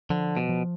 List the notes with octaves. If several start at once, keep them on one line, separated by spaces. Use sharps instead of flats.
D3 F3
B2
F3